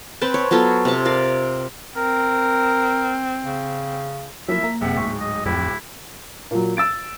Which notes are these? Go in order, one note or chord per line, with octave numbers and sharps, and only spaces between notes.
C4 B4 G5 A5
C#5
F#3 B3 F4 A4
C3 A5
A#4 D5 F5
C4 A#4
C#3
F3 F#3 A#3 E4 E5
A#3 A#5
F#1 C3 E5 F#5
D1 G#2 C#6
D#5
D1 F2 E4 G5
A#2 F#3
E6 A6 D7